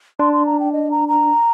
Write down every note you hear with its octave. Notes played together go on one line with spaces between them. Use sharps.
D4 C6
C6
A#5
G5
D#5
A#5
A#5